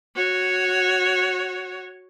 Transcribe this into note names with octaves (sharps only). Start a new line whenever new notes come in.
F#4 C#5